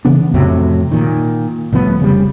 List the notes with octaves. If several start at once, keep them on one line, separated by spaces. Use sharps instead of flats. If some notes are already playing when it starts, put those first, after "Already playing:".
C#3 E3 B3 D4
F2 A2 C3 F#3
A#2 D#3
C2 A2 F3 B3
F1 C#3 G3